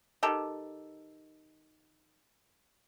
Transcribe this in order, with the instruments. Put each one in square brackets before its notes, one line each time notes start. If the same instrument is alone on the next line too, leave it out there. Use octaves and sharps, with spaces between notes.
[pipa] D#3 G4 A4